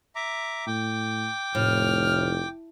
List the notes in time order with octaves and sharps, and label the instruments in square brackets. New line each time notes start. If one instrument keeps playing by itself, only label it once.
[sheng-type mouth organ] E5 A#5 D6
[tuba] A2 [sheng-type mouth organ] G5 D6
[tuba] F1 [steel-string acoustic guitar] A2 [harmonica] F6